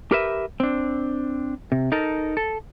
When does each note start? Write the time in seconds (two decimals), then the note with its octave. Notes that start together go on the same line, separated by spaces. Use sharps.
0.11 G4 A#4 B4 E5
0.60 C4 D4
1.72 C3
1.92 D#4 A4 A#4
2.37 A4